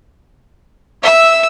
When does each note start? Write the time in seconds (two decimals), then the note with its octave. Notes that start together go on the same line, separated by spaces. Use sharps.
1.03 E5 E6